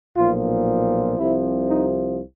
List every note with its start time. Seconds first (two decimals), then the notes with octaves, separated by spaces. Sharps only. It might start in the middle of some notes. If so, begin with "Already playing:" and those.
0.16 B1 A#2 F3 F4
1.18 C2 C3 F3 E4
1.69 D#4